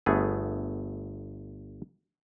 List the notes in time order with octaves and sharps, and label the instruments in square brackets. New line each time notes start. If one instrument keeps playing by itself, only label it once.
[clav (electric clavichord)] G1 A3 B3 G#4